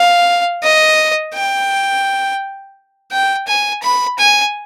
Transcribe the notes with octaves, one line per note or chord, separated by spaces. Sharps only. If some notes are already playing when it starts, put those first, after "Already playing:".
Already playing: F5
D#5
G5
G5
G#5
B5
G#5